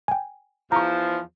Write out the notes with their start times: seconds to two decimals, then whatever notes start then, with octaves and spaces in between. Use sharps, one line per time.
0.08 G5 G#5
0.72 E2 F3 A#5 C#6